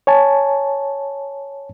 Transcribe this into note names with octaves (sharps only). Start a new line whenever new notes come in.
C#5 G#5 A5